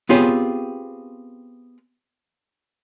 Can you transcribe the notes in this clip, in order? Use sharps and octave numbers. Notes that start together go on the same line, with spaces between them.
B3 C4 F4 G4 G#4 C#5